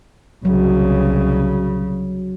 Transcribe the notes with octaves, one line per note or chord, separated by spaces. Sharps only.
C2 C#3 F#3